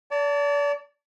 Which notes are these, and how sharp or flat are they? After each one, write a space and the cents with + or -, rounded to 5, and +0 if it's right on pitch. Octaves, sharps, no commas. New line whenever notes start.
D5 -40 A5 +20